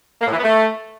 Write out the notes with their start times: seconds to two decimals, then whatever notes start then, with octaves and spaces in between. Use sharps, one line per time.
0.21 A#3
0.27 A2
0.32 E3
0.38 B3
0.43 A3